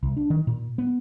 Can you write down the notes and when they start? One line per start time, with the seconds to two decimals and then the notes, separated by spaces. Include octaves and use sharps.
0.03 C2
0.17 D4
0.30 D#3
0.47 A#2
0.78 B3